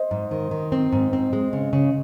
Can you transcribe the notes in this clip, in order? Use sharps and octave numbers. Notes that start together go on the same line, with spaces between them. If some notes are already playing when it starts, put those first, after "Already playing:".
Already playing: C5 D#5
G#2
D#3
D#3
C4
G#2
C4
G#3
C#3
C#3